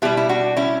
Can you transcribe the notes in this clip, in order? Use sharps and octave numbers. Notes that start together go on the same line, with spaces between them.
B2 G3 E4 G4
E4
D4 F#4
C#4 E4